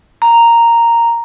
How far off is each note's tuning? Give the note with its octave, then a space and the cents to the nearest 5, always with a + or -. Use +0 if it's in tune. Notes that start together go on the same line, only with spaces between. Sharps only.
A#5 -5